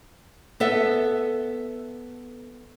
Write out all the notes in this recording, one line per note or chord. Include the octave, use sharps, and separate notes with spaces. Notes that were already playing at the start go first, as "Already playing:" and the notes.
B3 A4 E5